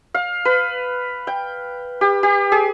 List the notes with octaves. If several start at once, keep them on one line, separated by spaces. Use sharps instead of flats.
F5
B4
G5
G4
G4
G#4